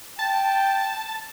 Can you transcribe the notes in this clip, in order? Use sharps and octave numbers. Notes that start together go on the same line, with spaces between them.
G5 A5